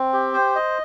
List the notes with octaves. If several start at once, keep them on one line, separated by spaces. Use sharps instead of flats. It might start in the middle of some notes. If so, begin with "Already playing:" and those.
Already playing: C4
G4
C5
D#5